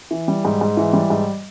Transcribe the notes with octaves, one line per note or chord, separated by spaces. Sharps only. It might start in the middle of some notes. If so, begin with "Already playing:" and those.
E3
G3
G#2
G#2
E3
G3
G#2